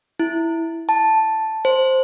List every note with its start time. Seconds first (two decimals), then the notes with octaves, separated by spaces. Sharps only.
0.20 E4
0.89 A5
1.65 C5